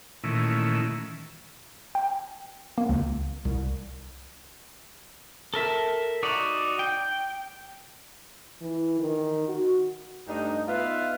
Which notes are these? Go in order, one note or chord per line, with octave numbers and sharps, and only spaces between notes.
A#2 D#3 E3 A3 C#4 E4
G5
A#3
C#2
C2
A4 A#4 E5
D#4 F#4 D5
G5
E3
D#3
F#4
G2 A3 D4 D#4
B3 D#4 F4 B4 E5 F5